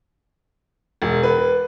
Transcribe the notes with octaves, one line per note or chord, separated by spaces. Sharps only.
E1
B4